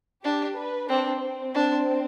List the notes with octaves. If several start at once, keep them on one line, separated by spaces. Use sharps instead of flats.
D4 G4
B4
C4 D4
C4
D4